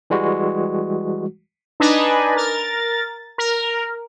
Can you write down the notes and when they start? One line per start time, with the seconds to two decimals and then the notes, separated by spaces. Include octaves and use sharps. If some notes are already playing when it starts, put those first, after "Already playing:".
0.10 E3 G3 G#3 F#4
1.80 D4 D#4 B4 D#5 G#5
2.36 A#4 A6
3.38 A#4